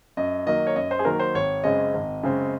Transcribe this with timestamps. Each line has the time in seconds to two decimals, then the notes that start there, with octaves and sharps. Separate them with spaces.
0.17 F#2 D#5
0.46 D#3 F#3 A#3 D#5
0.67 C#5
0.76 F#2 D#5
0.91 C5
0.99 G#4
1.05 D#3 F#3 A#3 A#4
1.19 C5
1.34 G#1 C#5
1.64 F#2 C#3 G#3 C4 D#5
1.94 G#1
2.23 F#2 C#3 G#3 C4